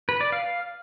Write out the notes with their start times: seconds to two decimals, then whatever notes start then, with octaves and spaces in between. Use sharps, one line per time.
0.09 B4
0.21 D5
0.32 F5